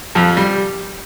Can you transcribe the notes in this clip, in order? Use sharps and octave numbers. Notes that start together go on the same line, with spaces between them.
F2 F3
G3